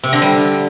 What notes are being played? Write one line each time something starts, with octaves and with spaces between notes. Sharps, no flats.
C3
D3
G3